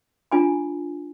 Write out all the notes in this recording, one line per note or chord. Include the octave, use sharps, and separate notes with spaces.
D4 F4 G#5 A#5